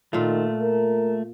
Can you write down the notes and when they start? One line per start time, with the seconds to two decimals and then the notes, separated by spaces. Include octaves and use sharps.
0.13 A#2 D#3 A3 F4
0.62 A#4